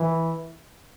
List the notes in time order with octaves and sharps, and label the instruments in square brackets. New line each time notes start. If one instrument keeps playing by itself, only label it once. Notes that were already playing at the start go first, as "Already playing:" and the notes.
Already playing: [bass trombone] E3